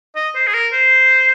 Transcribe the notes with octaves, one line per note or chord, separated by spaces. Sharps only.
D#5
C5
G#4
A#4
C5